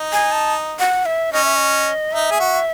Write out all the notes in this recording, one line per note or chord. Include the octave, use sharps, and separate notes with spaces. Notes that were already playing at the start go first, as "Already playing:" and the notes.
Already playing: D#4
G#5
A5
F#5
E5
C#4 D#5
E5
D#5
D#4 E5
G#4
F#4